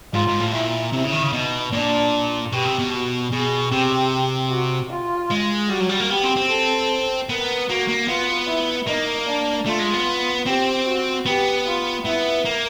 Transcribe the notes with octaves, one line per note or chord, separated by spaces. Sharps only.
G#2 F4
G#2
A2
A#2 E4
C3 E4
C#3
D#3
C#3
B2 D#4
A#2 D4
B2 G4
C3
B2
F#4
B2 G#4
C3 G4
F#4
F4
G#3
G3 F#4
F#3
G3
A#3
B3 G4
C4
C4
A4
B3 A#4
A#3 F#4
A#3
B3 F4
E4
A#3 D#4
D4
A3 F4
G#3
B3
C4 G4
F#4
B3 G4
F4
B3 E4
A#3